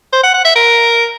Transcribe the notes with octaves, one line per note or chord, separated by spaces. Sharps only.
C5
F#5
F#5
E5
A#4